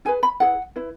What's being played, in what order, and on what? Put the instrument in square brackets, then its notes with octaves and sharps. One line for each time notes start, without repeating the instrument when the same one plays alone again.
[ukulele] E4 G#4 B4 G#5
B5
E4 G#4 B4 F#5
E4 B4